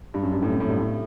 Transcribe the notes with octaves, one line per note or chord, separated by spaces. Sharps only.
G2
F#2
G2
A2
C3
A2
G2
A2